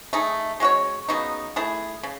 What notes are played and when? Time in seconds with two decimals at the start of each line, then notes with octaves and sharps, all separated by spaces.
0.13 A3 D#4 G#4
0.60 G#3 C#4 F#4 C#5
1.09 C#3 F#3 B3 D#4
1.56 A3 E4 G#4
2.03 C#3